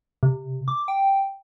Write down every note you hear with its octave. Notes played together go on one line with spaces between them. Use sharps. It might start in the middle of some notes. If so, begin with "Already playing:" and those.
C3
D6
G5